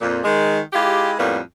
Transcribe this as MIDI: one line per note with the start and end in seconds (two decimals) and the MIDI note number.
0.01 0.19 41
0.01 0.19 46
0.24 0.59 51
0.24 0.59 56
0.72 1.12 56
0.72 1.12 64
0.72 1.12 65
0.72 1.12 67
1.17 1.38 41
1.17 1.38 45
1.17 1.38 55
1.17 1.38 58
1.17 1.38 59